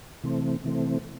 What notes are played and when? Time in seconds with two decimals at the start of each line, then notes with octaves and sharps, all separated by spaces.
0.24 C3 E3 A3 C4
0.64 C3 E3 A3 C4